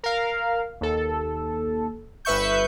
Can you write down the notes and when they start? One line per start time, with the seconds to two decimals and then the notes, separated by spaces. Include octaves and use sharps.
0.03 A#4 F5
0.81 D#2 A4
2.25 G1 B4 E5 C#6 G6